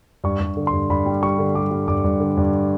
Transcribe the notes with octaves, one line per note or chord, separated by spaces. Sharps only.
G2 C#6
G2
D3
C6
G2
G2 B5
G3
G3 C#6
D3
G3 D6
G3
G2 D6
G2
D3
G2